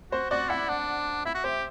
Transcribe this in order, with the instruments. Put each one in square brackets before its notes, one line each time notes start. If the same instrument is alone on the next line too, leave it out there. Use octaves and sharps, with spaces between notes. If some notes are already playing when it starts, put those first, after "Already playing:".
[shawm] F#4 [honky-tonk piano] C5
[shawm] F#4 [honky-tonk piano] D5
[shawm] E4 [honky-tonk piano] F#5
[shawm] D4
[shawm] E4 [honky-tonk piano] E5
[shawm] F#4
[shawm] G4 [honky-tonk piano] C5